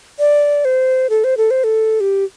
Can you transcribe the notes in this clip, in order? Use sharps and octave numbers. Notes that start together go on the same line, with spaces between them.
D5
C5
A4
C5
A4
C5
A4
G4